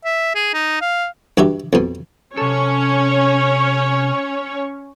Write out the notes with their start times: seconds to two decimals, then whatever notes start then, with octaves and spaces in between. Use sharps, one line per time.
0.05 E5
0.35 G#4
0.54 D#4
0.81 F5
1.37 G2 F#4 G4 E5
1.73 F2 B2
2.37 C3 C#4 A4 C#5